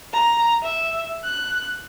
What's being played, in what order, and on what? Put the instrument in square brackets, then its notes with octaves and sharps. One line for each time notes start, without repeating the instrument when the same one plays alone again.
[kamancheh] A#5
E5
F#6